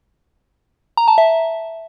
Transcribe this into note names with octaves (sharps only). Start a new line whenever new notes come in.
A#5
A5
E5